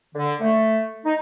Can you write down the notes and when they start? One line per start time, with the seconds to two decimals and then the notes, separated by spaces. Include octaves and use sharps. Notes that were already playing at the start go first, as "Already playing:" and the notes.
0.15 D3
0.41 A3
1.05 D#4